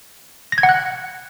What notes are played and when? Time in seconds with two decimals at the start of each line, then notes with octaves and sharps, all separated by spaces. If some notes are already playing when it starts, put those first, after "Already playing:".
0.52 A#6
0.58 G#6
0.63 F#5
0.69 F#6